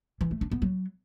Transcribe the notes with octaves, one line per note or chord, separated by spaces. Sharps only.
E3
A3
D4
B3
F#3